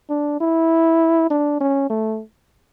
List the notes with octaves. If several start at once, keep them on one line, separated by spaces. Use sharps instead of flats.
D4
E4
D4
C#4
A3